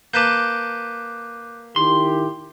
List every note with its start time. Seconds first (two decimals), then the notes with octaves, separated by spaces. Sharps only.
0.14 A#3 B4 A5 D6 F#6 G6
1.76 D#3 E4 G4 C6